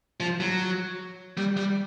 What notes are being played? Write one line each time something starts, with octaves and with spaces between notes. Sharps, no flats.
F3
F#3
G3
G3